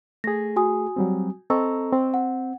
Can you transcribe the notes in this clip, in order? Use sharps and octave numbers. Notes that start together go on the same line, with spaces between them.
A3 G#4 A#6
F#4 G#5 D#6
F#3 G3 C4
C4 A4 D#5 A#5 C#6 E6
C4
F#5